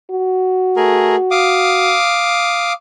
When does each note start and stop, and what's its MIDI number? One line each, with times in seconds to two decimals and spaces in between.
0.10 1.96 66
0.76 1.16 57
0.76 1.16 68
0.76 1.16 70
1.31 2.73 77
1.31 2.73 86
1.31 2.73 87